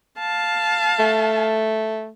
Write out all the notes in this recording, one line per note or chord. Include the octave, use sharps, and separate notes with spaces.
F5 A5
A3